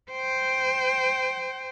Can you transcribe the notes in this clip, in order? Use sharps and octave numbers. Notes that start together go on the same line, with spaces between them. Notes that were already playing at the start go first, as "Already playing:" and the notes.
C5 G5